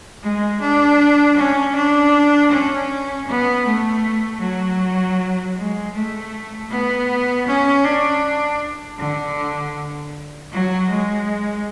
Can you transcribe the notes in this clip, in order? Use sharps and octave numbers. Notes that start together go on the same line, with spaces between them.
G#3
D4
C#4
D4
C#4
B3
A3
F#3
G#3
A3
B3
C#4
D4
D3
F#3
G#3